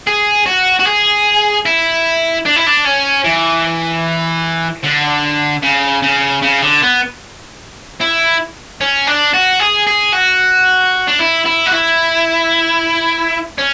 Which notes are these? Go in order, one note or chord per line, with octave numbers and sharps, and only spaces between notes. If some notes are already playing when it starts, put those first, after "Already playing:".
G#4
F#4
F#4
G#4
E4
D4
E4
D4
C#4
E3
D3
C#3
C#3
C#3
D3
B3
E4
C#4
D4
F#4
G#4
G#4
F#4
D4
E4
E4
F#4
E4
C#4